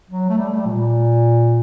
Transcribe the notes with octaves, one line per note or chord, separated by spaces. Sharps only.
F#3
A3
G3
A3
G3
A#2